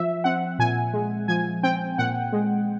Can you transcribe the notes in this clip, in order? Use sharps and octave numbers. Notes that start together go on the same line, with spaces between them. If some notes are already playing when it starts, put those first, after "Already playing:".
Already playing: F3 E5
C4 F#5
A#2 G#5
G#3
F3 G#5
C4 G5
A#2 F#5
G#3